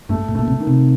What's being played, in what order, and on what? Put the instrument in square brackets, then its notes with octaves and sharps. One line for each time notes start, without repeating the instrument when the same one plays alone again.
[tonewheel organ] G2 [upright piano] A3
[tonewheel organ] A2
[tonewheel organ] A#2 [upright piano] A3
[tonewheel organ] C3
[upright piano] D#3
[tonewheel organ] C3